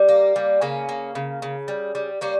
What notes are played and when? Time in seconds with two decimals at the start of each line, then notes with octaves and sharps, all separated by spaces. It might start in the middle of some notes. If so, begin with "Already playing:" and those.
Already playing: G3
0.09 A#3
0.36 G3
0.62 C#3 A#3 C#4
0.89 A#3
1.15 C#3
1.42 C#3
1.68 G3
1.95 G3
2.21 G3 A#3 C#4